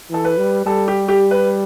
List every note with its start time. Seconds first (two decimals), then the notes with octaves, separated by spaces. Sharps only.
0.10 E3 A4
0.25 B4
0.38 G3
0.66 G3 A4
0.88 G4
1.08 G4
1.31 B4